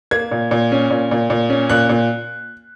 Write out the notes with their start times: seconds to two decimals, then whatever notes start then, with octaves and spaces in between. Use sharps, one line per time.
0.11 A#3 G#6
0.31 A#2
0.51 A#2
0.72 C#4
0.90 A#2
1.11 A#2
1.30 A#2
1.50 C#4
1.70 A#2 F#6
1.89 A#2